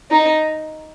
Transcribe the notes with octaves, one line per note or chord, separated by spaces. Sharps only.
D#4